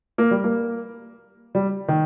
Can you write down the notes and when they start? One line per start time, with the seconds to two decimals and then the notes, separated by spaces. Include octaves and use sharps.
0.18 A#3
0.31 G3
0.44 A#3
1.55 G3
1.88 D#3